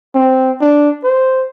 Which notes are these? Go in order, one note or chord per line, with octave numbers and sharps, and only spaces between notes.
C4
D4
C5